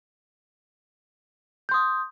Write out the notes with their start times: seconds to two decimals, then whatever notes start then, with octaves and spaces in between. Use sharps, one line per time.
1.69 G6
1.71 C6
1.74 D#6